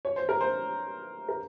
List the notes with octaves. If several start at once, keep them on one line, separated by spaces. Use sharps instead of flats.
C#5
C5
A#4
C5
A#4